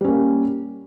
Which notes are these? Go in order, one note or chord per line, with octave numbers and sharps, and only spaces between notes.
G3 A#3 C#4